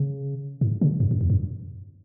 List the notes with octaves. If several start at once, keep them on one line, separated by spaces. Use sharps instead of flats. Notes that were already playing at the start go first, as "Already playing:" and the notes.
Already playing: C#3
G#2
C#3
F#2
F#2
E2
F#2